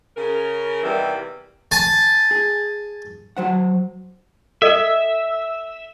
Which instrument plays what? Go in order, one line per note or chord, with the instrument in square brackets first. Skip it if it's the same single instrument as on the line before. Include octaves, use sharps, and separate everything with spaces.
[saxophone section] C#3 A#4
E2 C3 D#3 E3 G3
[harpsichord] G#5 A5
[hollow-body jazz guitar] G#4
F#3 C5 F#5
[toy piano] A4 D#5 [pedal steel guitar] E5